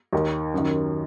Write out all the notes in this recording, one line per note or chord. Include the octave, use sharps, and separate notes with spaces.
D#2 D#3
F#2 D#3